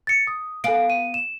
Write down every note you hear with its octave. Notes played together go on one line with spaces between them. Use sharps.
A6 C#7
D#6
B3 A4 F5 G#5 D7
D#7
E7